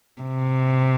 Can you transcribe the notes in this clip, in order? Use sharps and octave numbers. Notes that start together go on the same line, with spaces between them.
C3